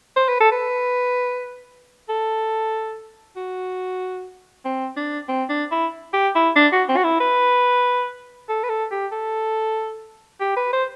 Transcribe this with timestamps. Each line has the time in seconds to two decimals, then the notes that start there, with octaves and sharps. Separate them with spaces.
0.16 C5
0.28 B4
0.40 A4
0.52 B4
2.09 A4
3.36 F#4
4.65 C4
4.96 D4
5.28 C4
5.49 D4
5.71 E4
6.13 G4
6.35 E4
6.56 D4
6.72 F#4
6.89 C4
6.97 F#4
7.04 E4
7.20 B4
8.49 A4
8.64 B4
8.69 A4
8.92 G4
9.12 A4
10.41 G4
10.57 B4
10.73 C5